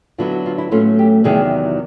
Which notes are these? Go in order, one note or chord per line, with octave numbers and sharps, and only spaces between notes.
D3 F#3 B3 E4 F4
F#4
F4
E4
A2 F#3 A3 C#4 F4
G4
E2 C3 D#3 F#3 G#4